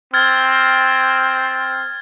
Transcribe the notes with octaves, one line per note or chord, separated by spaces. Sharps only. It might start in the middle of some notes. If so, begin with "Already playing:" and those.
C4 F6 G#6 A6